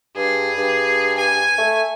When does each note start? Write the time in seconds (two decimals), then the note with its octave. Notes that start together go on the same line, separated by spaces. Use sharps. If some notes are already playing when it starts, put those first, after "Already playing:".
0.16 G2 G#4
0.57 G2
1.18 G#5
1.58 A3